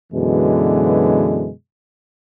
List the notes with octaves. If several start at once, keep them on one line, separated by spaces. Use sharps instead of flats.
F#2 B2 D3 E3 G#3